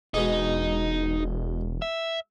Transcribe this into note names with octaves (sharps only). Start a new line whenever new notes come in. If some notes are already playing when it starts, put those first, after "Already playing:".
E1 B2 G#3 D#4 G#4
E5